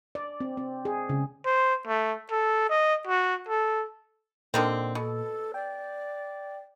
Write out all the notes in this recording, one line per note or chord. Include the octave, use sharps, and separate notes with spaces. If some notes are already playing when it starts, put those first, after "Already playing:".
D5
C4
C4
G#4
C#3
C5
A3
A4
D#5
F#4
A4
A#2 D3 D#3 C4
B2 A4
D5 G5